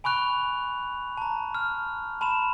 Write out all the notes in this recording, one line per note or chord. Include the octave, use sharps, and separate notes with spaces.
G#5 B5 C#6 F#6 F7
A5 A#5
F6
A5 B5 C6 E7